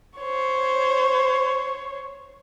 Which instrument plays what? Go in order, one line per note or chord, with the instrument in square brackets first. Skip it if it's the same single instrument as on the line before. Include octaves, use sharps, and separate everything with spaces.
[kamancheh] C5 C#5